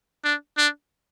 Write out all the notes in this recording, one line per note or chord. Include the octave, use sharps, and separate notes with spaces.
D4
D4